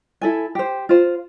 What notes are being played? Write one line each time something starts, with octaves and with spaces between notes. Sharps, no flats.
E4 A4 G#5
G4 C5
F4 C5